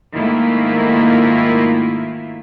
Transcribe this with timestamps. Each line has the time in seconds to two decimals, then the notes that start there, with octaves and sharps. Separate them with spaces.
0.14 G#2 D#3 A3 A#3 E4 F4